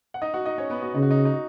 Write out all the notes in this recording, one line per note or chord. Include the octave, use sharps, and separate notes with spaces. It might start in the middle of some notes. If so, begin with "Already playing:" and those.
F#5
D#4 D#5
F#4 F#5
D#4 D#5
C#4 C#5
B3 B4
F#4
C#3 D#4
F#4
D#4
F#4
D#4
F#4